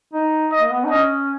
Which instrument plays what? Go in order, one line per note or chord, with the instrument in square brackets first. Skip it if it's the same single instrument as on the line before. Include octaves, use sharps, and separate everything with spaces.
[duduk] D#4
[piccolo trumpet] D#5
[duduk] A#3
B3
D#4
[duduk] C#4 [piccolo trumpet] D#5